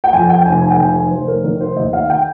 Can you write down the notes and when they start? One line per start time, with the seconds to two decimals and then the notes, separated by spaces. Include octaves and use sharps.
0.04 G5
0.13 F2 G#5
0.29 G5
0.45 F1 G#5
0.61 G#5
0.70 G5
0.78 D#3 G#5
0.95 G#5
1.10 F1 C5
1.28 A#4
1.44 D#3 A#4
1.61 C5
1.76 D#2 D#5
1.93 F5
2.10 G5